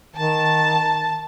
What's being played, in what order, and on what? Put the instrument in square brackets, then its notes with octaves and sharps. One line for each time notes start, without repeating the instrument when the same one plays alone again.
[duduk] D#3 [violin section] A5